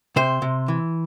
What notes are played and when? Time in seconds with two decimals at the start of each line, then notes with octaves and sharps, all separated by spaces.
0.16 C3 C5
0.42 C3
0.68 E3